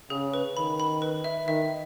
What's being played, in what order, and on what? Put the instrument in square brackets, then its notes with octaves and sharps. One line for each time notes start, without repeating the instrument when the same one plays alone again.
[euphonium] C#3 [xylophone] G#4
[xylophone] B4
[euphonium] D#3 [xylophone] B5
[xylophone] B5
B4
E5
[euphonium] D#3 [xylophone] E5